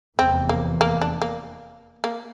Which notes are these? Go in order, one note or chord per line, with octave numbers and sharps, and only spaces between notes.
F1 E2 C3 E3 C4
A#3
A#3
D4
A#3
A#3